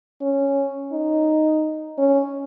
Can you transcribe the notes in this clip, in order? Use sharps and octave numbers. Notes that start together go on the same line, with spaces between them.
C#4
D#4
C#4